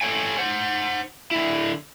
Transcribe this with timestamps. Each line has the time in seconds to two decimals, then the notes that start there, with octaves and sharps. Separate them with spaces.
0.01 A4 C#5 G5 G#5
0.38 C5 F#5
1.31 D3 E4